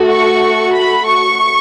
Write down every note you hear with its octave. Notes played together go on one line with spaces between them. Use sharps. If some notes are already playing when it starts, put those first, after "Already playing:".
Already playing: A3 F#4 A4
C#6
B5
C#6